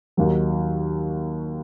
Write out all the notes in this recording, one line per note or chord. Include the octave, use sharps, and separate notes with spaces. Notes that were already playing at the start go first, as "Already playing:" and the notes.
D#2 D#3 F#3